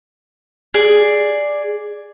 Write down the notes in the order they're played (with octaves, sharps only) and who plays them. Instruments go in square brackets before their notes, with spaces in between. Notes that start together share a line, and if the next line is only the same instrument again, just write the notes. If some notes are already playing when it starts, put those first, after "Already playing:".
[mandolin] G#4 D5